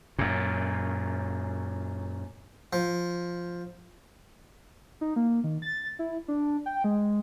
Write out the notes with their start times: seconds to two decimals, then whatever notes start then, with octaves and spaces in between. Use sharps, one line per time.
0.19 F#2 A#2
2.73 F3
5.01 D#4
5.16 A#3
5.44 D#3
5.62 A6
5.99 E4
6.28 D4
6.66 G5
6.84 G#3